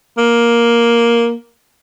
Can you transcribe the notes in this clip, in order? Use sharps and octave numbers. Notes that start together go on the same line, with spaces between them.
A#3